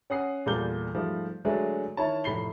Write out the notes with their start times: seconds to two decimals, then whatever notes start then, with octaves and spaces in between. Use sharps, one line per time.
0.10 C#4 F#5 D#6 C7
0.46 E2 A#2 G3 A4 G6 G7
0.94 G#2 F3 G3 A3
1.45 D3 F#3 G#3 A3 D4
1.97 D#3 E4 C#5 A5
2.24 F1 A2 B5 C7 G7